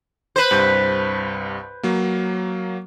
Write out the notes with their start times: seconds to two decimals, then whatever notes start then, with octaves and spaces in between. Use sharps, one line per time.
0.36 B4 C5
0.51 C2 G2 G6
1.83 F#3 A#3